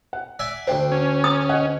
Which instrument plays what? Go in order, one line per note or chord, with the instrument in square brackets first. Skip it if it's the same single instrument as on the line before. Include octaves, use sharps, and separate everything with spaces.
[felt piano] F#5
[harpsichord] D5 E5 G#5
[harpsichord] D2 D4 [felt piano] C5 G5
[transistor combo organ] C#4
[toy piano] D#6
[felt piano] D#5 F#5